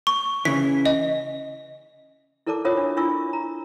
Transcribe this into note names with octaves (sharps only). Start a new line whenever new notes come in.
C#6
C#3 E3 B6
D#5
E4 A4 A#4 D5 A5 D6
C#4 F4 A#4 C#5 E5 D#6
D4
D4 E4 F4 C#6 E6
A#5